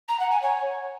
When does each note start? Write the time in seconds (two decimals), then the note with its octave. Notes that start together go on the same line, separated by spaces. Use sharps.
0.08 A#5
0.19 F#5
0.31 G#5
0.42 C#5